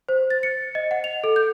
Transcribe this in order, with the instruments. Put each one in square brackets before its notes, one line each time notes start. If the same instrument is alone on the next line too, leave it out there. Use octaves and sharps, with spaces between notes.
[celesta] C5
A6
C#7
D#5
F#5
F7
A4
G6